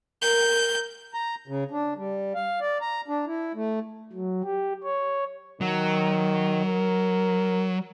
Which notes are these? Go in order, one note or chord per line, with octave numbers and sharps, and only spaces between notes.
A#4 G6
A#5
C#3
D4
G3
F5
D5
A#5
D4
E4
A3
F#3
G4
C#5
D#3 F#3
A#4